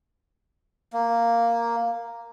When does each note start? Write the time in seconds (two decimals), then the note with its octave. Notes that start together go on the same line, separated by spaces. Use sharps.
0.93 A#3